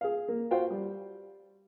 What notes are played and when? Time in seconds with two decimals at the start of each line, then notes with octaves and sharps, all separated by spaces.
0.01 G#4 F5
0.28 A#3
0.51 F4 F#4 C5 F5 G5
0.70 G3